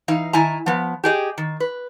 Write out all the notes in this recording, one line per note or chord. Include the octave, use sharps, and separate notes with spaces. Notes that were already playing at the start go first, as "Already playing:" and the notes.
E3 D#4 F5
D#3 E4 G#5 A#5
F3 B3
G4 G#4 D#5
D#3
B4